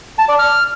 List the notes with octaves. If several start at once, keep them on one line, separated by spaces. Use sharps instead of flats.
A5
D5
F6